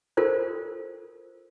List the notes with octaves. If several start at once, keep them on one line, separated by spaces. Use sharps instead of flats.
F4 A4 A#4 C5